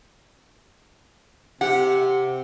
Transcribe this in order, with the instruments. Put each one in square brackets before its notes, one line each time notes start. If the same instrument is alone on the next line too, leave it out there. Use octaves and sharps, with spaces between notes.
[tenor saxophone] C3 [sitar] G4 [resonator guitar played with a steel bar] F#5